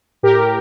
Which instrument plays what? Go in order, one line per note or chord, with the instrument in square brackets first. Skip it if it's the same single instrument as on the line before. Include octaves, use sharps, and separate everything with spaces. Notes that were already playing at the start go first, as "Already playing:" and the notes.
[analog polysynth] A2 G4 A#4